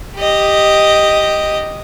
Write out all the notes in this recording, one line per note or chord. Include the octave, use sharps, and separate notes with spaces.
G4 D#5